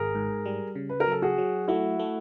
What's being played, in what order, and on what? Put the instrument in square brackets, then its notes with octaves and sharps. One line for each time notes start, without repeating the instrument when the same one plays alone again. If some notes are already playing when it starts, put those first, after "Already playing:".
Already playing: [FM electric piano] G#1 [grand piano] G#4 A#4
[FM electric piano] G#2
G3
C#3
[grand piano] B4
A#4
[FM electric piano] F#3 [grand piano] A4
[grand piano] F#4 G#4
[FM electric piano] F#3
[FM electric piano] A3 [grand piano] E4 F#4
[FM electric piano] A3